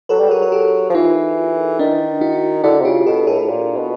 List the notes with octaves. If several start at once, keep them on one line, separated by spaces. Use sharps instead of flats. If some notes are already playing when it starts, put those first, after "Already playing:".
F#3 A4 B4
G3
F#3 G#4 A#4
A#4
G4 A4
F3
E3 D#4 F4
D#3 D4 E4
E4 F#4
D3 E4 F#4
C3
C#3 F4 G4
B2 G4 A4
A2 G#4 A#4
A2
A#2
B2